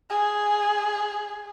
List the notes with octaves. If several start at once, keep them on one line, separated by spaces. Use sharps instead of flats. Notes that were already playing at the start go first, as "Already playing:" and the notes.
G#4